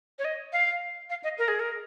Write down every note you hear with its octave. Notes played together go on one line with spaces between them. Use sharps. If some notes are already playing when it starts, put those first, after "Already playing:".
C#5
D#5
F5
F5
D#5
A#4
G#4
A#4